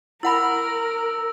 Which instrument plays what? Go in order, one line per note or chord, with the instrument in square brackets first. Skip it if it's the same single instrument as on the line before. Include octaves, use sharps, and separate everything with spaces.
[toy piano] E4 F#5 B5 [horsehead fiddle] A#4 [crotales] E6 A#6